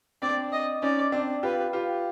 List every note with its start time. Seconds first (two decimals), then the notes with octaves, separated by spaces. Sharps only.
0.22 C4 D4 D5
0.52 D#5
0.82 C#4 D#4 D5
1.12 C4 D4
1.43 F4 G4 B4
1.73 F4 G4